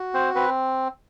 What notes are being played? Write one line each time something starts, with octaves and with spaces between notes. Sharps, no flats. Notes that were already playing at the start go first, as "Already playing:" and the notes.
Already playing: F#4
C4 C5
C4 B4